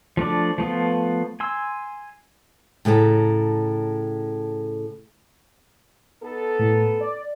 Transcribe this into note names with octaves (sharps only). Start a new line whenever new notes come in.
F3 A3 D4 D5
F3 A3 B3 F4
G#5 C6 E6
A2 C#3 A4 G#5 A#5
B3 D#4 A4
A2
D5